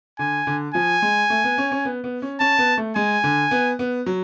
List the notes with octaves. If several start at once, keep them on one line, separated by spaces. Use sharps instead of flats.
D3 G#5
D3
F3 G#5
G#3
A3
B3
C#4
C#4
B3
B3
C#4
C#4 A5
B3
A3
G#3 G#5
D3
B3
B3
F#3